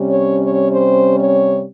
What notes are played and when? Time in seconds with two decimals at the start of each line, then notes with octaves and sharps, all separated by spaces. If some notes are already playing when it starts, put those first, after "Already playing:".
Already playing: C3 G3 C#4
0.10 C#5
0.42 C#5
0.73 C5
1.19 C#5